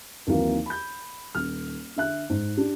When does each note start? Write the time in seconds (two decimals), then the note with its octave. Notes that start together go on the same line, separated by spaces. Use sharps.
0.27 D#2 C3 D#3 E3 F#3 A#3
0.66 B5 G6
1.34 D#1 F6
1.96 D3 E5 F#6
2.30 G#2
2.57 D4 G4